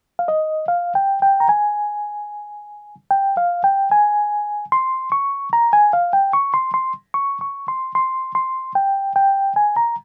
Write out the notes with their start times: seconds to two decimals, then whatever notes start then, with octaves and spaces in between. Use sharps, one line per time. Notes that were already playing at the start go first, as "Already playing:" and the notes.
0.19 F5
0.28 D#5
0.68 F5
0.95 G5
1.22 G5
1.40 A#5
1.49 G#5
3.11 G5
3.37 F5
3.64 G5
3.92 G#5
4.72 C6
5.12 C#6
5.53 A#5
5.73 G#5
5.93 F5
6.13 G5
6.33 C#6
6.54 C6
6.74 C6
7.14 C#6
7.41 C#6
7.68 C6
7.95 C6
8.35 C6
8.75 G5
9.16 G5
9.56 G#5
9.77 A#5